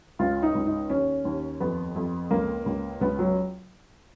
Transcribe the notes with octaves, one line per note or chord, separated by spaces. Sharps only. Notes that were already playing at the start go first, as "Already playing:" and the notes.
C#2 F4
D#4
C#2
D#4
D#2 C#4
D#2
F2 B3
F2
C#2 A#3
C#2
C#2 B3
F#3